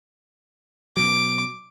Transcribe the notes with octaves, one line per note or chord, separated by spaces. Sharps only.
B2 F#3 D6